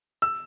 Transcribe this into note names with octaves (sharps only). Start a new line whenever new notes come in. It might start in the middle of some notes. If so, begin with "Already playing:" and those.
E6